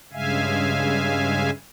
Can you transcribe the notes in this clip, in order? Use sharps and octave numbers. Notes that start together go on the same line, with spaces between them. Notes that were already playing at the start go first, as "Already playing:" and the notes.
G2 C#3 G#3 E5 F5 G#5